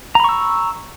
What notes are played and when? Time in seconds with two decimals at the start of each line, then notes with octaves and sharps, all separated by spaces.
0.15 A#5
0.20 B5
0.24 C#6
0.29 E6